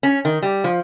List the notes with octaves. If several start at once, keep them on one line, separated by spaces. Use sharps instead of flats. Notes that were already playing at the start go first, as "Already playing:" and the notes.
C#4
D#3
G3
F3